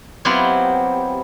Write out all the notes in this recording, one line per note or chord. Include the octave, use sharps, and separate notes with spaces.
F#3 B3 C4 E4 F4 G4